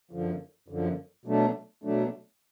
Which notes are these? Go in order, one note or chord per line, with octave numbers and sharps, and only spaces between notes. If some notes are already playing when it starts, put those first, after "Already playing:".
F#2 D3 F3
F#2 D3 F3
B2 F#3 A3 D4
B2 F#3 A3 D4